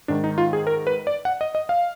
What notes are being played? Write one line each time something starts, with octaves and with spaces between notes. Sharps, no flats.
G#2 D#3 D4
D#4
F4
G#4
A#4
B4
D5
F#5
D#5
D#5
F5